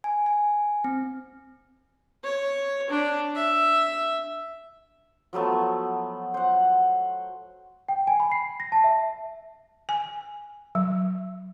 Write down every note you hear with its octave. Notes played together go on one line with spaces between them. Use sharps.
G#5
G#5
C4
C#5
D4
E5
F3 F#3 A3 B3
C5 F#5
G5
G#5
B5
C7
A#6
A5
E5
G#5
F#3